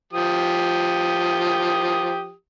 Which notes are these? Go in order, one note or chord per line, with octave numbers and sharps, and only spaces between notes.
F3 G4 D#6